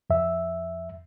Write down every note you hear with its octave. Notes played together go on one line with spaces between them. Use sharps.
F2 E5